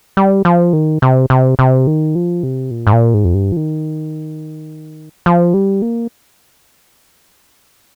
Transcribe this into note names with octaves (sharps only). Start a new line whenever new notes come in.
G3
F3
D#3
C3
C3
C3
D#3
F3
C3
A#2
G#2
A#2
G#2
F2
G2
F3
D#3
F3
G3
A#3